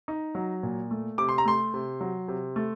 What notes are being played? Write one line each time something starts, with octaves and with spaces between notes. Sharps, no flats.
D#4
F#3
A#2
A3
C3 D6
C6
A#5
A3 C6
C3
F#3
C3
A3